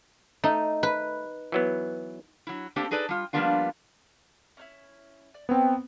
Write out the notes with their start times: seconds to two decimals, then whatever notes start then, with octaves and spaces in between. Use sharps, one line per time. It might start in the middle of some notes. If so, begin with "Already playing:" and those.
0.44 A3 D#4
0.83 B4
1.52 E3 F#3 B3
2.47 F#3 E4
2.76 A3 A#3 C4 D4 G4 A4
2.91 D#4 G#4 A4 B4 D5
3.09 G3 F4
3.33 F3 G3 A#3 B3 D4 F4
4.57 C#4 D#4 E4
5.34 D5
5.49 B3 C4 C#5 G5 A5